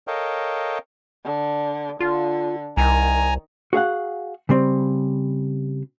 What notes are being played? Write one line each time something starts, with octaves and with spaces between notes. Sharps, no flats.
A4 A#4 C#5 D#5 F5 G5
D3
D3 F4
C2 D#3 G#5 A#5
F#4 G#4 F5 F#5
C#3 G3 C4